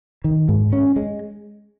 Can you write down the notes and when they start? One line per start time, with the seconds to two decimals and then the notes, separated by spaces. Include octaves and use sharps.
0.24 D#3
0.49 G#2
0.73 C#4
0.96 G#3